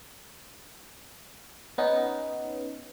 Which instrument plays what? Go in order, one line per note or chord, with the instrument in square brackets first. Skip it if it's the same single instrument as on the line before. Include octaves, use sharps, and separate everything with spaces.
[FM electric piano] B3 C#4 D#4